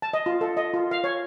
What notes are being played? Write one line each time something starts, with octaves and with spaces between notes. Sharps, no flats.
A5
D#5
F4
A4
D#5
F4
F5
C#5